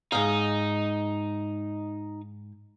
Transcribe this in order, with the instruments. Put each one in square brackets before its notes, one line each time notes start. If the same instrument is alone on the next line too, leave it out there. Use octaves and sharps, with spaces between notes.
[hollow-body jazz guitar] G#2 F5 [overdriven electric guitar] D#4